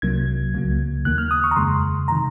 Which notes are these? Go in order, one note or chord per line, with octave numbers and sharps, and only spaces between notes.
C2 C3 F#3 A#3 G#6
C#2 C#3 F#3 A#3
D#2 D#3 A#3 F#6
F6
D#6
C#6
A#5
F2 C#3 G#3 C6
C3 D#3 A#5